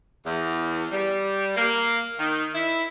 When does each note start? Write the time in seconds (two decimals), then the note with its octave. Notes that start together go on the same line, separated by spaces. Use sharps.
0.25 E2
0.91 G3
1.56 A#3
2.17 D#3
2.55 E4